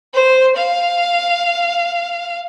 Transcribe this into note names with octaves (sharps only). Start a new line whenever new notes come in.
C5
F5